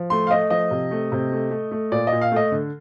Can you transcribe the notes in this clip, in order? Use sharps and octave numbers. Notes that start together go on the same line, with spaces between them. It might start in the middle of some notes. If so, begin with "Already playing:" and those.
Already playing: F3
A3 C6
F5
A3 D#5
F3 D#5
C3
A3
C3
A3
A3
A3
A#2 D5
D#5
A#2
F5
A3 D#5
D3